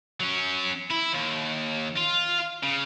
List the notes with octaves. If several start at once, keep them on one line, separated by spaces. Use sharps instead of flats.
F#3 C#4
E4
D#2
F4
C#3